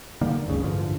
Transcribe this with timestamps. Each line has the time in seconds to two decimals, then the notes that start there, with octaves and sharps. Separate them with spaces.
0.21 D3 D#3 G3 A#3
0.46 F#1 C#2 C#3
0.63 A1 G2 D3 F3